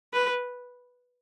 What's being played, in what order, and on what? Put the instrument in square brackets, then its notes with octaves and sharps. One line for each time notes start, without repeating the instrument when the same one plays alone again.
[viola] B4